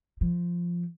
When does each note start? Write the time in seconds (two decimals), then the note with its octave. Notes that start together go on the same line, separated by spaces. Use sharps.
0.21 F3